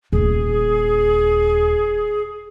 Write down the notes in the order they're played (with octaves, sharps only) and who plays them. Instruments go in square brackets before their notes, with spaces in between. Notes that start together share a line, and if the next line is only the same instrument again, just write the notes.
[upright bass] D#1 D4 [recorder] G#4